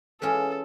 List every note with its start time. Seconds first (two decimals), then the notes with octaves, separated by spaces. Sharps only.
0.21 E3 G#3 C#4 F4 G#4 A4